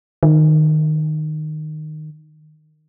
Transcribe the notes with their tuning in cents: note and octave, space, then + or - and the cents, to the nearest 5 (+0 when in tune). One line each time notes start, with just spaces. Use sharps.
D#3 -15